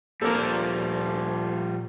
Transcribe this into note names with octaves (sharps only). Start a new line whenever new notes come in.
D2 A#2 F3 G3 A#3 A4 A#4